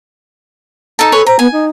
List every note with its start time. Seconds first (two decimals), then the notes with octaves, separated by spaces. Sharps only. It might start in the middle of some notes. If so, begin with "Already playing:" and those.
0.99 D#4 A4 A5
1.12 A4 B4 C#5 G#5
1.26 C5 A#5
1.39 B3 G#5
1.52 D#4